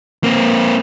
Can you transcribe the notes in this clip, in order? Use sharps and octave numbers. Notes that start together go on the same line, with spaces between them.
A#3 C4